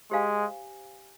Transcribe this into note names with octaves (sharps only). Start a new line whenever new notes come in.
G#3 G4 C5 F5 G#5